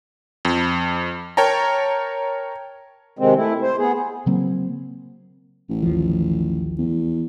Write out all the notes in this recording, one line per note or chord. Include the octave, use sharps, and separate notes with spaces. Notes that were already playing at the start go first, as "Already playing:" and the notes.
F2
A#4 C#5 G5 A5 A#5
C3 D#3 G#3 C4
A3 E4
C5
B3 G#4
C#3 F#3 A#3 C4
A1
D#2 F3
E2